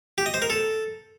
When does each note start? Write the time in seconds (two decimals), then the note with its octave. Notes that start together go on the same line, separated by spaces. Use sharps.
0.18 G4
0.26 D#5
0.34 C5
0.42 A#4
0.50 A4